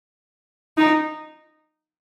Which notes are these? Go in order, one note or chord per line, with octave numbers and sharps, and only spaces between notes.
D#4